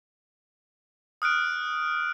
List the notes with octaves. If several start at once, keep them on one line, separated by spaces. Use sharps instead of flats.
D#6 F6 F#6 D7